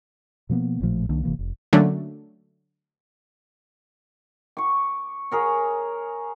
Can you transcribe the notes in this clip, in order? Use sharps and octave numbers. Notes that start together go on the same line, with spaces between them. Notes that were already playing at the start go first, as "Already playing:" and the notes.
B2 F3 A#3 B3
A1 A#2 F3 A3
C2 D#3 A#3 D4
G1 C3 E3 A#3
F1
D3 F#3 A3 A#3 C#4 D4
C#6 D6
G#4 A#4 C#5